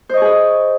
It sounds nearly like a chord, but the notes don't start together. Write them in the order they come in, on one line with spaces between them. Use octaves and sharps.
C5 D#5 C#6 G#4 B4